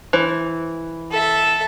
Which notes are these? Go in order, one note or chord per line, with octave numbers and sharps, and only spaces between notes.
E3 C5
A4 E5